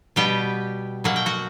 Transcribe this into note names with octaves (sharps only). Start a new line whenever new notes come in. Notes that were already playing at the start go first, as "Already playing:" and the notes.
B2 G3 B3 G4 G5
B2 F#3 A#3 F#5
G5
F#4 F#5